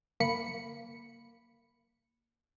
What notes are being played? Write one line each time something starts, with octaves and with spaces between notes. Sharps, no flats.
G1 A#3 B5 C#7